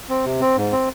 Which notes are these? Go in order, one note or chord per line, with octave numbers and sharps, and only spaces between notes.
C4
C3
C4
G#2
C4